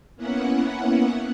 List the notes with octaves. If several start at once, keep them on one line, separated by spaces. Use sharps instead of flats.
A#3 B3 C#4 E4 F#5